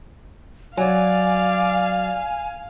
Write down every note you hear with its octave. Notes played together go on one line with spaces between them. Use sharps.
F#3 D5 F5 G#5